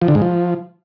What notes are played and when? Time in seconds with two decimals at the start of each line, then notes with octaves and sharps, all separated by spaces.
0.02 F3
0.08 D3
0.15 G#2
0.22 F3